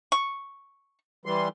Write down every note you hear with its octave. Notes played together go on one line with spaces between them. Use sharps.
C#6
E3 G3 C6